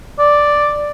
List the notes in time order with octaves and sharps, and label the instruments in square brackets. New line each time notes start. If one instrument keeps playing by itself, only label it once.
[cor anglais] D5